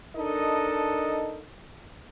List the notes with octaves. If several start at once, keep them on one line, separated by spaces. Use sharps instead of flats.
D4 D#4 A4 A#4 D#5